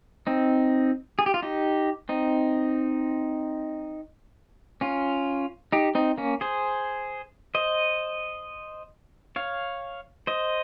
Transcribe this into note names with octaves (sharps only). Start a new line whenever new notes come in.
C4 D#4
G#4
G4
F4
D#4 G4
C4 D#4
C#4 F4
D#4 G4
C4 D#4
A#3 C#4
G#4 C5
C5 D#5
C#5 F5
C5 D#5